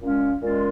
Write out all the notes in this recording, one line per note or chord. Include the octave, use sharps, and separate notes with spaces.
A#2 G#3 C#4 F4
A#2 G#3 C#4 F4